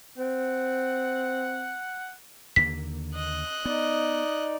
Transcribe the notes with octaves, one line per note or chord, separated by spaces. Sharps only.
C4 F#5
D#2 D3 A#3 B6
D#5 F#6
B3 D#4 D5